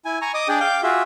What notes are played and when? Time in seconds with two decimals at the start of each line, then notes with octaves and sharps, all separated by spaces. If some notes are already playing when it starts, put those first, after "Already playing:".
0.05 E4 G#5
0.22 G#5 A#5 C#6
0.34 D#5 D6 D#6
0.48 D4 G#4 D5 G5
0.60 F5 G5 D6 G6
0.83 F4 F#4 G#4 E5